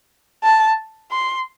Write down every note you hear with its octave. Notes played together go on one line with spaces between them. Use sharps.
A5
C6